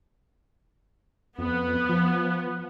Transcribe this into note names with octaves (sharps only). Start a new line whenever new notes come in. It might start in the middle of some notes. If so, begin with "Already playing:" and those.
F2 B3
F3